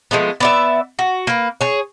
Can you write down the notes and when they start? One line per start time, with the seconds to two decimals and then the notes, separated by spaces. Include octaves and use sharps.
0.11 F3 G#3 A3 B3
0.40 B3 D5 E5
0.99 F#4
1.27 A#3 B4
1.61 G#4 C#5